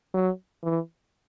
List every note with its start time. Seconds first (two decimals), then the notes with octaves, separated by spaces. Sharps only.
0.14 F#3
0.63 E3